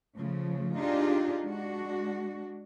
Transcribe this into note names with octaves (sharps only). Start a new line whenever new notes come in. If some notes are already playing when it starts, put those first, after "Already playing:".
C#3 F3 A3
D4 D#4 F4 G4 G#4
G#3 D4 F#4